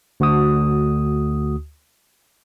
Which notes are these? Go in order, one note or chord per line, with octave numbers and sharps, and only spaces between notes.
D2 F#4 D#6